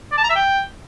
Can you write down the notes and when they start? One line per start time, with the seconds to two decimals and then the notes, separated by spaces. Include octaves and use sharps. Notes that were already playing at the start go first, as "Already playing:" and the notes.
0.12 D5
0.18 A5
0.24 A#5
0.30 E5
0.35 G5